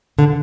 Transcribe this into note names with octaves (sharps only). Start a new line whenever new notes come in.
D3